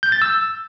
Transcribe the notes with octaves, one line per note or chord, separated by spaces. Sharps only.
G6
A6
E6